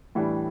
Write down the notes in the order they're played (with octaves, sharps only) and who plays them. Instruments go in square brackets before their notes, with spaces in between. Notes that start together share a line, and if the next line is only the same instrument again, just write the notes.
[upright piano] A2 E3 G3 D4